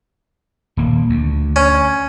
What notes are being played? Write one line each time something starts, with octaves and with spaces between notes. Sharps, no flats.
D#1 A#3
D2
C#4